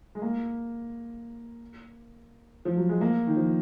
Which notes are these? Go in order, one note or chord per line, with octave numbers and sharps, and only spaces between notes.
G#3
A#3
F3
F#3
G#3
A#3
D#3
F3